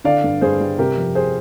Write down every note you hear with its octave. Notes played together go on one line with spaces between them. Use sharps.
D3 D5 F5
G2
G2 G#4 C5
G3
C3 G4 A#4
F2
G#4 C5